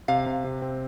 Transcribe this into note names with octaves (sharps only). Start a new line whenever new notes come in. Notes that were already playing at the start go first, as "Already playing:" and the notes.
C3 F5
C3
C3
C4